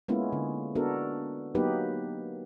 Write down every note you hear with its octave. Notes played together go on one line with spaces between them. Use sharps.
G#3 A#3 B3 C#4 E4 F4
D3
B3 D4 F#4 A4 A#4
F#3 A#3 B3 D#4 G4 B4